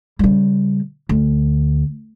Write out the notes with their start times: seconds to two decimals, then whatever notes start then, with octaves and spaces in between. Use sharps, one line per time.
0.19 C#3 G3
1.09 D2